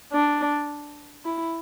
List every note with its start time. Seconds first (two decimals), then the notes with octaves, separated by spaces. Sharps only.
0.13 D4
1.25 E4